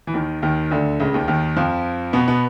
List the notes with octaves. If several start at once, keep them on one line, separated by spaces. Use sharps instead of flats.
E3
D#2 D#3
D#2 D#3
D2 D3
C#2 C#3
D#2 D#3
D#2 D#3
F2 F3
B2 B3
B2 B3